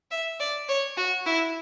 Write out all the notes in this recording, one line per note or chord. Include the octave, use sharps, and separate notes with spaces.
E5
D5
C#5
F#4
E4